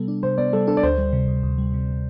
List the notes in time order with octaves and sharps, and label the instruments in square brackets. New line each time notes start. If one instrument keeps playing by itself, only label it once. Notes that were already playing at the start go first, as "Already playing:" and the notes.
Already playing: [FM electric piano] C3 G3 B3 [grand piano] A4
[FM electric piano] D4
[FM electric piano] C3 [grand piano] C5
[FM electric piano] B3 [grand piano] D5
[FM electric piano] G3 [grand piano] A4
[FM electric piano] D4 [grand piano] A4
[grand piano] D5
[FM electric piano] D2 [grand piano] C5
[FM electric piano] G3
C3
D2
D2
G3
C3